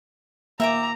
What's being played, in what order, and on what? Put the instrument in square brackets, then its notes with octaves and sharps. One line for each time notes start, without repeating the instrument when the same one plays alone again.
[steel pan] A#3 [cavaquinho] E5 G5 D6 [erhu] A#5